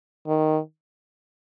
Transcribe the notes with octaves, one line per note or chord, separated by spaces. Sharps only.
D#3